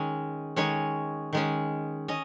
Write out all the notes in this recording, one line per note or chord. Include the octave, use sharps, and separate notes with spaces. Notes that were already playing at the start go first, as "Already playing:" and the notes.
Already playing: D#3 G#3 C#4
D#3 G#3 C#4 C#5
D#3 G#3 C#4
C#4 D#5